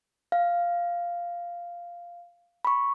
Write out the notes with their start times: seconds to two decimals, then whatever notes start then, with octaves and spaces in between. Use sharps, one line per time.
0.32 F5
2.65 B5 C#6